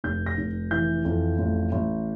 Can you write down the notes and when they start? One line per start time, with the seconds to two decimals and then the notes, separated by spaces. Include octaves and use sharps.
0.04 F1 G6
0.26 A#6
0.38 F1
0.71 E3 G6
1.05 F2
1.39 A1
1.72 A1